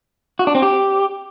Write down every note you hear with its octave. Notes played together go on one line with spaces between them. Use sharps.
F#4
D4
C4
G4